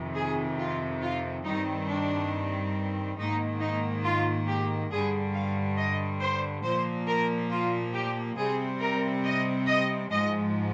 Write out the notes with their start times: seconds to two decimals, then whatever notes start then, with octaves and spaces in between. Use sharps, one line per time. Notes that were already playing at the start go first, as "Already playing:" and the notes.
Already playing: F2 C3 D#3
0.15 G#4
0.58 F4
1.01 F4
1.44 G2 D#3 G3 C4 D#4
1.87 D4
3.17 G#2 D#3 A#3 D#4
3.60 D#4
4.04 F4
4.47 G4
4.90 G2 D3 G3 G#4
5.34 F5
5.77 D#5
6.20 C5
6.64 A#2 F3 A#3 C5
7.07 A#4
7.50 F4
7.93 G4
8.37 C3 G3 C4 G#4
8.80 A#4
9.24 D#5
9.66 D#5
10.10 G#2 F3 G#3 D#5